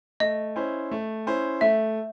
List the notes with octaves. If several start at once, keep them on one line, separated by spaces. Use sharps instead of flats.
A3 D#5
C#4 E4 C5
A3
C#4 E4 C5
A3 E5